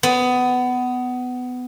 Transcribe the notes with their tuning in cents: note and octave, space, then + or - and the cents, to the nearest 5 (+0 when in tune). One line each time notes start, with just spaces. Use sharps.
B3 +20